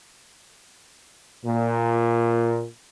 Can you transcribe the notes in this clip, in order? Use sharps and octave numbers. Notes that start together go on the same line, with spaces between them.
A#2